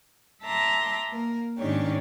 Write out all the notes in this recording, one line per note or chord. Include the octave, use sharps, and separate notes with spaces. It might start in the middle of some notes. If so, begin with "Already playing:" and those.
E5 A5 A#5 C6 D6
A#3 A#4
G#2 D#3 C#4 D4 G4 C#5